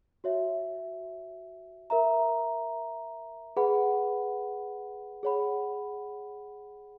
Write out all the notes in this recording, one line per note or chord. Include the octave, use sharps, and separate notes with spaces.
F#4 C#5 E5
A#4 E5 A#5
G#4 B4 F#5 B5
G#4 C#5 F#5 B5